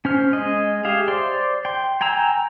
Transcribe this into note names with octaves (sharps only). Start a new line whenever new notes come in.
C#4 C5 F6
G#3 D#5
G4 G#4 E5 F5
C5 D5 C6
G5 C6
G5 G#5 A#5 E6